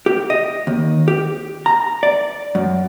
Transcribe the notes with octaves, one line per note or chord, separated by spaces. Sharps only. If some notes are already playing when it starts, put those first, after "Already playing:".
G4
D#5
D#2
G4
A#5
D5
F#2